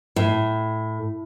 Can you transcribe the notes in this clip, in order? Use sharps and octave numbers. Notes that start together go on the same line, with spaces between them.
A2